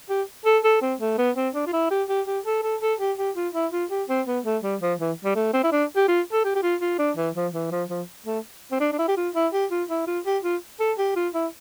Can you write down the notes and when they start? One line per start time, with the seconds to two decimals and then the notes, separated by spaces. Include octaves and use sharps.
0.09 G4
0.46 A4
0.64 A4
0.82 C4
1.00 A3
1.18 B3
1.36 C4
1.54 D4
1.67 F4
1.73 E4
1.91 G4
2.09 G4
2.27 G4
2.46 A4
2.63 A4
2.81 A4
3.00 G4
3.18 G4
3.36 F4
3.54 E4
3.72 F4
3.91 G4
4.09 C4
4.27 B3
4.45 A3
4.63 G3
4.81 F3
5.00 E3
5.24 G3
5.36 A3
5.53 C4
5.64 E4
5.72 D4
5.96 G4
6.08 F4
6.33 A4
6.44 G4
6.55 G4
6.63 F4
6.81 F4
6.99 D4
7.17 E3
7.35 F3
7.53 E3
7.71 F3
7.90 F3
8.26 A3
8.72 C4
8.80 D4
8.92 D4
8.98 E4
9.08 G4
9.17 F4
9.35 E4
9.53 G4
9.71 F4
9.89 E4
10.07 F4
10.26 G4
10.43 F4
10.80 A4
10.98 G4
11.16 F4
11.34 E4